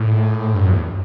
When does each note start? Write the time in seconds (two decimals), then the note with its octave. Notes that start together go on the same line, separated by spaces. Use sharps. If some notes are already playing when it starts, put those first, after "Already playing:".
Already playing: A2
0.55 G2
0.63 F#2
0.72 E2